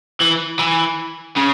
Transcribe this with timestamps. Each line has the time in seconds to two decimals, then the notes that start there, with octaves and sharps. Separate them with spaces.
0.21 E3
0.59 E3
1.37 C#3